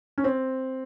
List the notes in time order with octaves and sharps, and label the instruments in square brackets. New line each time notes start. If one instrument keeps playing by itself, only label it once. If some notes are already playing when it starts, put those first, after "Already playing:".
[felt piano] C#4
C4